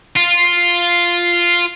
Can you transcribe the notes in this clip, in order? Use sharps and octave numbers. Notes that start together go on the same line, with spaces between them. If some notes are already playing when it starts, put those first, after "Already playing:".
F4